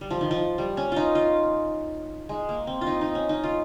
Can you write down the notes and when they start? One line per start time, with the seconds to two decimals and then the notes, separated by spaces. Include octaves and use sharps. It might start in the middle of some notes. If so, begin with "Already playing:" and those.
0.01 G3
0.11 F3
0.21 D#3
0.31 F3
0.58 G3
0.77 C#4
0.92 D#4 F4
1.15 F4
2.29 G#3
2.49 A#3
2.67 C4
2.81 F4
2.87 D#4
3.01 D#4
3.15 C#4
3.29 D#4
3.43 F4